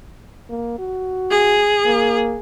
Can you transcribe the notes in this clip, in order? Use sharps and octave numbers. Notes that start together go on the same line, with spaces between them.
A#3
F#4
G#4
A#3